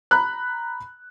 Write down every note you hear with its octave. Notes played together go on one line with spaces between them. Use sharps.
A#5 B5 F#6